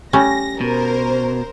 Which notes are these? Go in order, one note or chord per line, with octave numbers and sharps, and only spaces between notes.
G3 A3 C#4 A#6
B2 A#4 C5